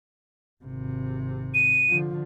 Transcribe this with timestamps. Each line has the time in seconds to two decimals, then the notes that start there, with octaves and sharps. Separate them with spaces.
0.64 G#1 C3
1.54 D#7
1.89 D3 F3